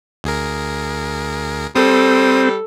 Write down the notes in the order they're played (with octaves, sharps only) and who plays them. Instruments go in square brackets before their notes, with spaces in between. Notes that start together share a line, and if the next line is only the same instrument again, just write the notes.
[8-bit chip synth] D2 G#4 A#4
[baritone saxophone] G3 [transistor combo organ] C4 [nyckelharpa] A4 [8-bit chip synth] C5 D#6